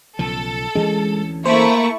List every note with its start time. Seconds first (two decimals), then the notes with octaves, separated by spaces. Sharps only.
0.19 B1 C#3 F3 A4
0.75 D2 E3 G#3 C#4
1.46 A3 A#3 E4 C5 C#6